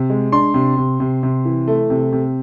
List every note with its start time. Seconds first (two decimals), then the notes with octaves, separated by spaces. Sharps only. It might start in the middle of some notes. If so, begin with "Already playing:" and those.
Already playing: C3
0.10 G#3
0.32 D4 C6
0.54 C3
0.77 C3
1.00 C3
1.23 C3
1.45 E3
1.68 A3
1.90 C3
2.13 C3